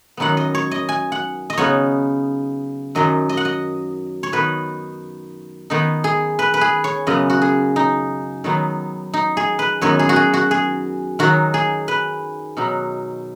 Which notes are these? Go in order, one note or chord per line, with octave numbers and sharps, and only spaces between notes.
F#2 D#3 B3 D#4 F#5
D#5
C#5
D#5
G#5
F#5
D#5
C#3 B3 D#4 C#5
F#2 D#3 F#3 D#5
D#5
F#5
D#5
C#5
D#3 B3 D#4 B4
D#3 B3 D#4
G#4
B4
B4
G#4
C#5
F#2 C#3 B3 D#5
F#4
G#4
D#4
D#3 F#3 B3 D#4
D#4
G#4
B4
F#2 D#3 B3 D#4 C#5
G#4
F#4
G#4
F#4
G#4
D#3 F#3 D#4 F#4
G#4
B4
B2 F#3 D#4